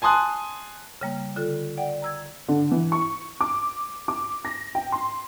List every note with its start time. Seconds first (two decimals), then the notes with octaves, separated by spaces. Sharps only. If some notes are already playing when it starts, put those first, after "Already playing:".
0.02 G#5 A5 C6 D#6 F#6
1.01 C#3 G3 A#3
1.36 D3 F4 A4
1.77 D5 F#5 G5
2.02 A#5 E6 G#6
2.48 D3
2.71 E3
2.92 C#6
3.41 D6
4.08 D6
4.45 A#6
4.75 G5
4.92 C6